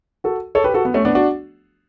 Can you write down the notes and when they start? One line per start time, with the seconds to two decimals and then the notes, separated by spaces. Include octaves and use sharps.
0.24 F#4 A4
0.55 A4 C#5
0.64 G4 B4
0.74 F#4 A4
0.85 B3
0.94 A3 C#4
1.05 B3 D4
1.15 D4 F#4